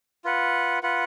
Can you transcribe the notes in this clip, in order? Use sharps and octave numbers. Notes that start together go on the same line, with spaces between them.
F4 B4 F#5
F4 B4 F#5